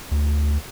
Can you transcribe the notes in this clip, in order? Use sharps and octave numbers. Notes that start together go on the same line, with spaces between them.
D2